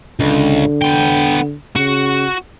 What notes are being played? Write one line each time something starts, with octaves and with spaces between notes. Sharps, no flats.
C#2 D3
B3 G5
C#3 F#4